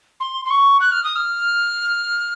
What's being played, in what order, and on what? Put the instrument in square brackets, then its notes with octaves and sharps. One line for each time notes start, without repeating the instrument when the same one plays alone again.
[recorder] C6
C6
C#6
F#6
F6
D#6
F6